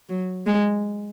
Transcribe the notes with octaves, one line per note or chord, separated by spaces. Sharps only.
F#3
G#3